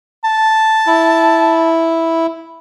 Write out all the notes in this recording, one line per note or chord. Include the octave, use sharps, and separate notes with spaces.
A5
E4